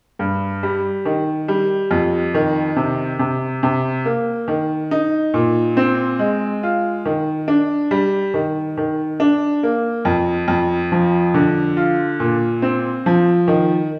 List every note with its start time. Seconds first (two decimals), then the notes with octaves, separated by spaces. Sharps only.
0.19 G2
0.63 G3
1.05 D#3
1.48 G3
1.91 F2
2.34 D#3
2.76 C3
3.19 C3
3.63 C3
4.05 A#3
4.48 D#3
4.91 D#4
5.34 A#2
5.77 C4
6.19 G#3
6.63 F4
7.06 D#3
7.48 D4
7.91 G3
8.34 D#3
8.77 D#3
9.20 D4
9.63 A#3
10.05 F2
10.48 F2
10.92 F3
11.34 D3
11.77 F4
12.20 A#2
12.62 C4
13.06 F3
13.48 D#3